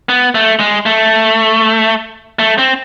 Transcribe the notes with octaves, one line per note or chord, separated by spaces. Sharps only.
B3
A3
G#3
A3
A3
C4